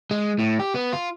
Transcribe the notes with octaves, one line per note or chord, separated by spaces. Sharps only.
G#3
A2
G4
B3
F4